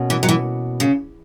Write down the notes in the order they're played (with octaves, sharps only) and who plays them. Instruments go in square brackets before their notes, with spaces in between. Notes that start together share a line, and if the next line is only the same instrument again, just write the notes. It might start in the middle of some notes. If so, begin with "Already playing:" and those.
Already playing: [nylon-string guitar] B2 A#3 C#4
[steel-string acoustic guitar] E3
F#3
E3
C#3